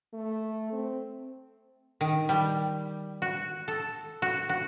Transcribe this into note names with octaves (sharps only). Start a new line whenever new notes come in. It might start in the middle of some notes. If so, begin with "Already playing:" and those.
A3
C4
D#3
G3
F#4
A4
F#4
F#4